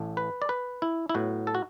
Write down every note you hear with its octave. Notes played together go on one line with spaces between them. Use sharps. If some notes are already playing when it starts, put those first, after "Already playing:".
Already playing: A1 A2 A3
B4
D5
B4
E4
E4
A2 F#3 B3 F#4
A4
F#4